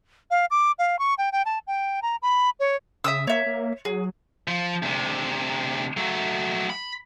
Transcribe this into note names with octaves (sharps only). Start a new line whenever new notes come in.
F5
D6
F5
C#6
G5
G5
A5
G5
A#5
B5
C#5
C#3 E5 D#6 E6
A#3 C#5 E5
A#3
F#3 G#4
F3
D2 C3
F#3 A3
B5